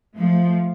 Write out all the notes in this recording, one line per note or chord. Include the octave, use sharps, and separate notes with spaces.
F3 A3